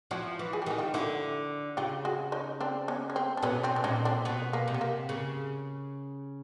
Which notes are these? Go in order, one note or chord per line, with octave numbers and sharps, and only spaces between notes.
F3 E4 F#4
E3
G#4
G4
D#3 F#4
F4 G4
D3 E4 F#4
C#3 F4 G4
F#4 G#4
C#4 D#4
C4 D4
B3 C#4
C#4
C4
D4
B2 B3 C#4
C4 D4
D4
A#2 C#4 D#4
C4 D4
B2 B3
A#3
C3
B3
A#3
C#3